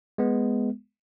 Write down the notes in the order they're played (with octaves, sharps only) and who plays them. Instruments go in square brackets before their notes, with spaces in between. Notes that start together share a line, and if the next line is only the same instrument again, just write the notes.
[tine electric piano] G#3 B3